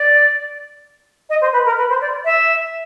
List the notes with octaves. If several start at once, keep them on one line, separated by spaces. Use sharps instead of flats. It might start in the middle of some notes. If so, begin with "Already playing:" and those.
Already playing: D5
D#5
C5
B4
A#4
B4
C5
D5
E5